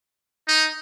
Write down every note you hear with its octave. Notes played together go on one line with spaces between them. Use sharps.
D#4